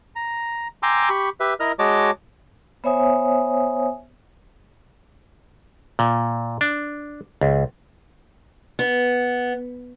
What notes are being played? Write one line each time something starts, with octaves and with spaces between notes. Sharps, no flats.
A#5
G5 G#5 A#5 C6 D6 E6
G4 B5 C#6
G4 B4 E5
E4 A#4 D#5 F6
G#3 F#4 C#5 D#5 A5 D6
B3 C5 C#5 E5 G#5 D#6
A#2
D4
C#2
B3